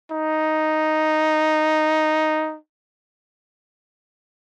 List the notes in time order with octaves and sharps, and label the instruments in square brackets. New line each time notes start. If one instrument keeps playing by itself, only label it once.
[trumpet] D#4